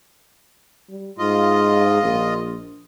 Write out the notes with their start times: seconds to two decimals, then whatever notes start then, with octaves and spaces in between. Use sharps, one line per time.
0.89 G3
1.19 G#2 F4 D#5
2.03 A#1